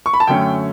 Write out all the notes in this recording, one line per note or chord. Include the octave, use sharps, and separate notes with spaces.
C#6
B5
A5
F#2 D3 A3 C#4 G5